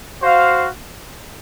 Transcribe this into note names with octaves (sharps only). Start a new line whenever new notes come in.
F#4 C5 F5